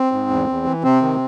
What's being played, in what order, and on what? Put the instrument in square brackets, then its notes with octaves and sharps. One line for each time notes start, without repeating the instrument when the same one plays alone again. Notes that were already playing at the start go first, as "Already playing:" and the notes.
Already playing: [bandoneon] C4
G#2
E2
E2
E3
C3 C4
D#3